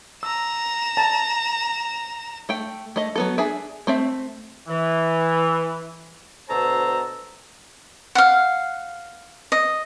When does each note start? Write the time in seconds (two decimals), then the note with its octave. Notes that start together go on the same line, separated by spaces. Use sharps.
0.23 A#5 E6 E7
0.97 A5
2.49 A3 G5
2.96 A3 D#5
3.16 F#3 B3 A4
3.38 D4 G#4 E5
3.87 A3 C4 E5
4.69 E3
6.49 D2 B2 C5 A5 A#5 E6
8.15 F5 F#5
9.52 D#5